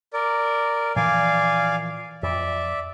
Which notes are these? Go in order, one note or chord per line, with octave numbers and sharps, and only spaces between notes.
A#4 D5
A#2 E3 F3 D5 F5 G#5
F2 D5 E5